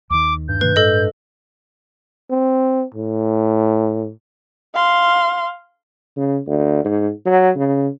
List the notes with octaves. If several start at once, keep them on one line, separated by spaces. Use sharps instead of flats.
D#2 D#3 D6
G2 G6
B2 D#3 A3 B4
A2 G#3 A4 D#5
C4
A2
F5 C6
C#3
D2
G#2
F#3
C#3